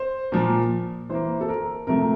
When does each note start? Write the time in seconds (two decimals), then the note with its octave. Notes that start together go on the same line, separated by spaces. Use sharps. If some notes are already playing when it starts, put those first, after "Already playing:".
Already playing: C5
0.32 A#2 F3 A#3
1.09 E3 A#3 C5
1.41 A4
1.48 A#4
1.87 C3 F3 A3 A#4